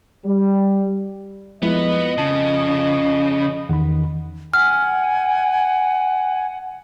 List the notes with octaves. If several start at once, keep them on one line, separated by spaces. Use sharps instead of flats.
G3
F2 F3 G#3 B3 E4 D#5
C#3 A5
E2 D#3 F#5 B5
F#5 G#5 F6